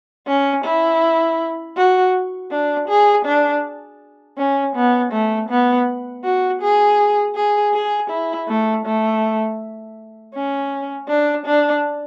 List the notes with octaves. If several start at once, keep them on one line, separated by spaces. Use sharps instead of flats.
C#4
E4
F#4
D4
G#4
D4
C#4
B3
A3
B3
F#4
G#4
G#4
G#4
E4
A3
A3
C#4
D4
D4